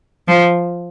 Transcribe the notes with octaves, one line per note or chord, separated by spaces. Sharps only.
F3